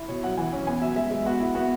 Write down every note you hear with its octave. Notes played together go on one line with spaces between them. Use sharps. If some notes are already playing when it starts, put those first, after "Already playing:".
Already playing: E4
B2 C#5
F#3 F#5
E3 G#5
C#4
B3 G#5
F#3 E5
G#3 E5
G#3
B3 F#4
E4
B3 F#4